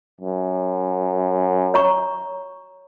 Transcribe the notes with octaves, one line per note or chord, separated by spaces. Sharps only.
F#2
C#5 A#5 C#6